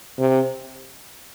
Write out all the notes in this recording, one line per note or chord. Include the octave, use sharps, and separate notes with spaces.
C3